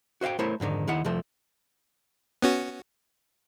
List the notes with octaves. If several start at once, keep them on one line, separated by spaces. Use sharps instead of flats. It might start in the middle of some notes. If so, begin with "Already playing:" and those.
F#4 C5 D#5 F5 G5
A3 E4 A#4 C5 C#5
F2 G#2 D3 D#3
D#2 D#3 E4 F#5
C2 F2 F3 A3
B3 C#4 F#4